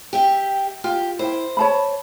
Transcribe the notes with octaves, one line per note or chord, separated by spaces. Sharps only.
G4 E5 G5
F4 G4
E4 C5 G5
C#5 A5 B5